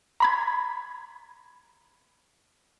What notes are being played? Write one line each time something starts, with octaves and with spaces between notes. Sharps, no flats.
A#5 B5 G#6